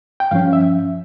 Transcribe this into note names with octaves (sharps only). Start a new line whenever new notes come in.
G5
G2 F3 C#4 F5
E5